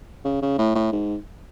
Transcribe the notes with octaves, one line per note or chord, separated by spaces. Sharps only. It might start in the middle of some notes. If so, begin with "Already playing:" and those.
C#3
C#3
A2
A2
G#2